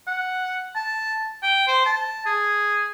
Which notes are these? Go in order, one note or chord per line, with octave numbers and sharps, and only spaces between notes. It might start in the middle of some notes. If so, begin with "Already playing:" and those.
F#5
A5
G5
C5
A5
G#4